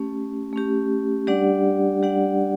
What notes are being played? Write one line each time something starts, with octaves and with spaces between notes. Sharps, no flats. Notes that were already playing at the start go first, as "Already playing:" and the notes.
Already playing: A3 C#4 G4
A3 C#4 G4
G3 D4 G4 D5 F#5
G3 D4 G4 D5 F#5